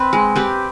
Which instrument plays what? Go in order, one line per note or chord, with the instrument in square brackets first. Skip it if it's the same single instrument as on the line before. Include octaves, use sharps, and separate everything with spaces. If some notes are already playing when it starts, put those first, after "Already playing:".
Already playing: [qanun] C4 B4
G#3
C4 G4 B4